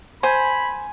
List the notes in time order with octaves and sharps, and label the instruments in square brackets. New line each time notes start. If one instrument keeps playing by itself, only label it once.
[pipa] C5 [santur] G#5 [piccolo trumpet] B5